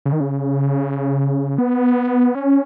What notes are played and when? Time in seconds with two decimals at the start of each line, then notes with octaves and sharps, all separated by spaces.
0.05 C#3
0.12 D#3
0.20 C#3
1.58 B3
2.35 C#4